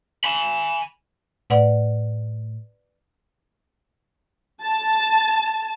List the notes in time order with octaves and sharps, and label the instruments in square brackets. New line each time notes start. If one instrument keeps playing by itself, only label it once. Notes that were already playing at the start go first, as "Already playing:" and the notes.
[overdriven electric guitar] G#5 B5
[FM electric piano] A2 [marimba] B4 D5 F#5
[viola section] A5